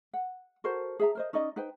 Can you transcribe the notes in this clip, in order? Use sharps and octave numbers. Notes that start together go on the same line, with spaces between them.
F#5
F#4 A4 A#4 C5
G#4 E5 A#5
A#4 C5 D#5
C#4 D#4 D5 D#5
D#4 B4 C5 G5